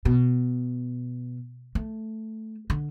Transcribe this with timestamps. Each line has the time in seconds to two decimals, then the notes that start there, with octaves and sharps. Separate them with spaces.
0.05 B2
1.75 A3
2.70 D3